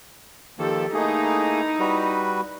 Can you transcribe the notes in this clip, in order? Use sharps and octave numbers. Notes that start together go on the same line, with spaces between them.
D#3 F3 A#3 G4 A4
A3 A#3 D#4 E4 G#4
G3 F#4 B4